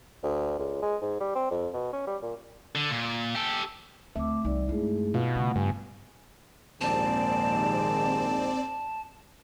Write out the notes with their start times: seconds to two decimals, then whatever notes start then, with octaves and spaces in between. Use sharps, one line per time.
0.23 D2
0.59 C#2
0.82 G#3
1.02 G#2
1.20 G3
1.35 C4
1.51 F2
1.74 B2
1.93 C#4
2.07 G3
2.22 A#2
2.75 D3
2.91 A#2
3.35 G4 A4
4.16 D2 A3 B3 C4 E5 D6
4.44 C2 E3 G3 D#4 D5
4.69 G2 G#3 A3 E4 G#4
5.14 B2 F4 F5
5.35 C#3 G3 A3 F#5
5.56 G2 B3 G#5
6.81 A#1 D#2 G#2 C4 D5 A5